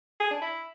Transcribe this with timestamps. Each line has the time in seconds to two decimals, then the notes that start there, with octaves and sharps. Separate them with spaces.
0.20 G#4
0.31 D4
0.42 E4